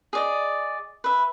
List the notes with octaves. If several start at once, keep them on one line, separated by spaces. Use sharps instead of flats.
G#4 D5 D#5
B4 E5